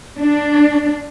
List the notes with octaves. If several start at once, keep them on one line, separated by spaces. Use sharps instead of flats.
D4